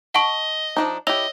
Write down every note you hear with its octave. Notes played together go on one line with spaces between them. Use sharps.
D#5 F#5 A5 C#6
F3 D4 D#4
E4 G4 C#5 D#5 E6 F7